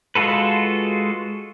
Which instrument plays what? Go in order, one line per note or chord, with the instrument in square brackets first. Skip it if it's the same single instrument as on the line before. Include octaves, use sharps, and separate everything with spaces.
[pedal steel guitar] G#3 F4 F#4 A4 B4